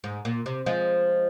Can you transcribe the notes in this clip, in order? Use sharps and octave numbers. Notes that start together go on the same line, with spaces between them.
G#2
A#2
C3
F3 G#3